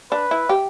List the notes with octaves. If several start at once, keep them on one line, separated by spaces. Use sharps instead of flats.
D4 B4
E4
G4